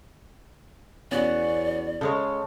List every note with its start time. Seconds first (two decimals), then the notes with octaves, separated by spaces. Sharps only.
1.11 E2 B3 C#4 F#4 D5
2.01 C#3 G#3 A4 C#5